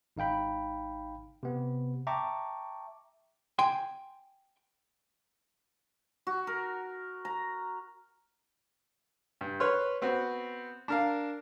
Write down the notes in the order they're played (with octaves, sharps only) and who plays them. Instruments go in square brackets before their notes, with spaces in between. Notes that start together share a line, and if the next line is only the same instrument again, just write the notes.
[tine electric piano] G#1 D#4 F5 G5 B5
C3 B3
E5 G5 A5 A#5 C#6 D6
[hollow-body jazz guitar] G5 G#5 C6
[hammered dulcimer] F#4
A#4
A#5
[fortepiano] G2
B4 C#5 C6 F6
B3 C4 F#4
D4 A#4 F5